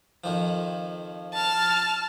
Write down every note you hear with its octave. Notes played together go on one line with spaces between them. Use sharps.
F2 D#3 F3
A5 F6